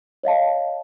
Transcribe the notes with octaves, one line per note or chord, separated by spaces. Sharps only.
C#5 D#5 F5 A5